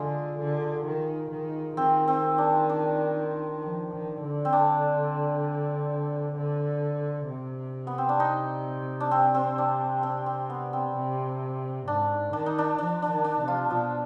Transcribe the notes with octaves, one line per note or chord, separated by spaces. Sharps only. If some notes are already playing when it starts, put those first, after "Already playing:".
Already playing: D3 G#3 F4 G#4
D3
D#3
D#3
D#3 C4
C4
D4
D4
F3
D#3
D3
C4
D4
D3
C3
B3
C4
D4
D#4
D4
C4
C4
D4
C4
C4
B3
C4
C3
G#2 D4
D#3 D4
D#4
D4
F3 D4
D4
D#3
D4
C3
F3 F4
B2 F3 F4